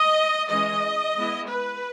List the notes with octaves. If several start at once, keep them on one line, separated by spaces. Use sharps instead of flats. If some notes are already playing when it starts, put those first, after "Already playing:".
Already playing: D#5
E3 G#3 C#4 D#5
G#3 B3 E4
B4